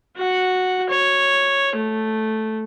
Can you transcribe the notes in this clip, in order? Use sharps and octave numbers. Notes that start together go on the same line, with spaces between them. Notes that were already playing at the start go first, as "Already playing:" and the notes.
F#4 F#5
C#5
A3